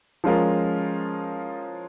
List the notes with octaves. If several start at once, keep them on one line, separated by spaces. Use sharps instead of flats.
F3 G#3 C#4 F4 A#4